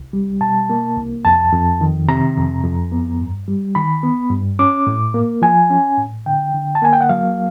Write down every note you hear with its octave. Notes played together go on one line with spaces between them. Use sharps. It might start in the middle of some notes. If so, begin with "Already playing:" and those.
Already playing: C2
G3
B2 A5
A#3
C2
F2 A5
F2
D#3
C3 A#5
F2
F2
B3
G2
G3
D#3 B5
B3
G2
C#4 D6
A2
A#3
F3 G#5
C#4
A2
D3 G5
D3
A5
A#3 G#5
G5
F#5
F#3 F5